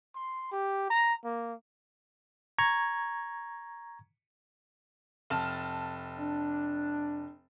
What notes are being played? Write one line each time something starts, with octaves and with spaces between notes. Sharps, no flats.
C6
G4
A#5
A#3
A#5 C#6 G#6
F1 A5 F6
D4